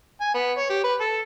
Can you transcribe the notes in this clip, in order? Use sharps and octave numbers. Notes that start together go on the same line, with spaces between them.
G#5
B3
C#5
G4
B4
A4